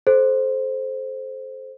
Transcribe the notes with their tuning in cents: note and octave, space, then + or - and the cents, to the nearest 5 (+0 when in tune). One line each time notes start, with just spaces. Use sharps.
A4 -30 C5 +0